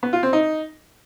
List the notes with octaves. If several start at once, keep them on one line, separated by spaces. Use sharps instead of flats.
B3
F4
C4
D#4